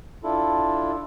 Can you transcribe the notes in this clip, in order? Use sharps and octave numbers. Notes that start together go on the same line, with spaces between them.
D4 E4 F4 A4